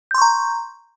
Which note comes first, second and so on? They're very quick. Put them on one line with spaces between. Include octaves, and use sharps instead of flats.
G6 C6 C#6 A#5